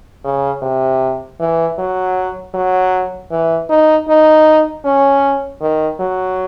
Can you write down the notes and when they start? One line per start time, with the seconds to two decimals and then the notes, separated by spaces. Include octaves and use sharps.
0.24 C#3
0.62 C3
1.40 E3
1.78 F#3
2.54 F#3
3.31 E3
3.69 D#4
4.08 D#4
4.85 C#4
5.61 D#3
6.00 F#3